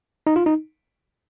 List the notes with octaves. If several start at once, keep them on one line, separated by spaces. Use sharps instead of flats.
D#4
F4
D#4